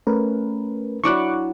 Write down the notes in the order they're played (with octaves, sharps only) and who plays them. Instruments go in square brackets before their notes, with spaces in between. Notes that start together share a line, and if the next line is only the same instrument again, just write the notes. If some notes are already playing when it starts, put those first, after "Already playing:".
[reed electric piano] A3 C#4 [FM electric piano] A#4 B4
[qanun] F#3 D4 E4 [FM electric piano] C#6 D6 F#6